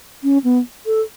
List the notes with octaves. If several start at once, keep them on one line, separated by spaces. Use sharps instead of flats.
C#4
B3
A4